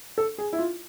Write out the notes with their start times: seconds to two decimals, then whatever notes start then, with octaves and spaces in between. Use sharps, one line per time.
0.18 A4
0.38 G#4
0.53 E4
0.59 F4